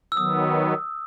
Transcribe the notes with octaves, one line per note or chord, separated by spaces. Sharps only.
E6
D#3 F#3 B3 D#6